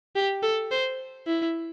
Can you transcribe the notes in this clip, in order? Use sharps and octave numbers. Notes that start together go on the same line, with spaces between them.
G4
A4
C5
E4